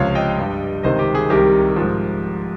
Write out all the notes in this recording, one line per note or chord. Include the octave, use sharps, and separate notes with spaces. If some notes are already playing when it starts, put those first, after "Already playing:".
Already playing: C#2 C3 F3 C#5 F5
D#5 G5
G2 G3
C#2 C3 D#3 C5 D#5
G4
G#4
C2 C3 D#3 G3 G4 A#4
G#2 F3